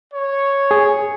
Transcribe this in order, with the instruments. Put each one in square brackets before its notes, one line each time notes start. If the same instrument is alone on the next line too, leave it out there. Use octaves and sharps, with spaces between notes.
[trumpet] C#5
[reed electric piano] G#4